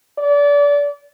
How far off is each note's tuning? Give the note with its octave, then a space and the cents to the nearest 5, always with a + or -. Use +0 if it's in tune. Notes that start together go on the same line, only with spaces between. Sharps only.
D5 -30